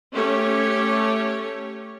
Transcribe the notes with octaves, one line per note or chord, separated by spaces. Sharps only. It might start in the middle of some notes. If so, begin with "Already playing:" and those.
A3 C#4 G4 C#5